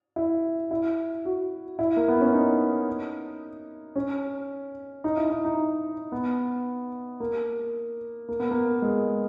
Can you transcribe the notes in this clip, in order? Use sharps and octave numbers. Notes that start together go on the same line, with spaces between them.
E4
E4
F#4
E4
A#3
B3
C#4
D#4
C#4
D#4
E4
D#4
D#4
B3
A#3
A#3
B3
A#3
G#3